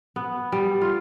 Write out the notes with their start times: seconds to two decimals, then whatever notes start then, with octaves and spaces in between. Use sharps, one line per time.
0.16 B3
0.52 G3
0.81 F4